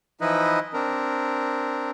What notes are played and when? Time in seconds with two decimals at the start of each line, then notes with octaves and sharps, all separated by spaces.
0.21 E3 F3 D#4 E4 B4 D#5
0.73 C4 D4 A#4